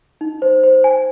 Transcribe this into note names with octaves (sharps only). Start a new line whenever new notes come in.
D#4
C5
C5
G#5